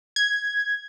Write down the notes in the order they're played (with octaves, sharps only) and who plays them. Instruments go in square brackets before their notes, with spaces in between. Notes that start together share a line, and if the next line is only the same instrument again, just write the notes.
[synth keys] G#6